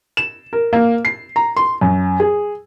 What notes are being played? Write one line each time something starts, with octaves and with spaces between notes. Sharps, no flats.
E7
A#4
A#3
C7
A#5
C6
F#2
G#4